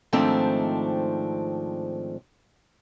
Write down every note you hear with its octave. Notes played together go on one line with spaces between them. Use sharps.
G#2 D#3 F3 A3 C4 D4